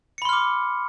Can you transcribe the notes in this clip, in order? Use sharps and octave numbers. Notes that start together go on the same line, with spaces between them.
B5 C6 D6 F6 C#7